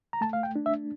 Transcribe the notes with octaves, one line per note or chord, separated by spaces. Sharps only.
A#5
A3 A5
F5
G5
D4
E5